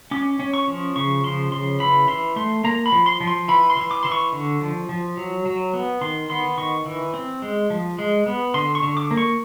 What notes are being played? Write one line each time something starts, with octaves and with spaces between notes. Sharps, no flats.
C#4 D6
C#4
C#6
F3
C#3 C#6
F3 C6
C#3 C6
E3 B5
E3 C6
A3 C6
A#3 A#5
B5
F3
C6
F3
C6
E3 B5
C6
E3
D6
E3 C6
C#6
D3
F3
F3
F#3
F#3
B3
D#3 C6
B3 C6
D#3 C#6
E3
C4
G#3
F3
G#3
B3
D3 C6
C#6
D3
D6
A#3
C#6